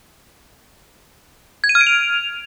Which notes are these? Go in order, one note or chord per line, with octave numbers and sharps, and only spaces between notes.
G#6
D#7
F6
D7
F7